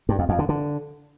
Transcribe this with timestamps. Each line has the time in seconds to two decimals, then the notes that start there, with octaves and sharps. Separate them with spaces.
0.09 G2
0.19 F2
0.29 F2
0.39 D3
0.49 D3